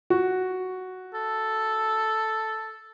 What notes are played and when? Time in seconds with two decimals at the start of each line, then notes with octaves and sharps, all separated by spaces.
0.10 F#4
1.14 A4